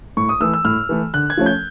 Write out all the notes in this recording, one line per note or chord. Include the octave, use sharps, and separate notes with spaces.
A2 C#6
D#6
E3 A3 E6
E6
A2 F6
E3 A3
D3 F#6
G#6
F3 A3 C#4
G6